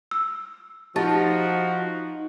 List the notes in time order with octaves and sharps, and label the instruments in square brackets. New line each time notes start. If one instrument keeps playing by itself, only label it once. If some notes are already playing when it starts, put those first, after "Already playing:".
[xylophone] E6
[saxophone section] F3 [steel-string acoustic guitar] D#4 [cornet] F#4 [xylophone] G4 A5 A6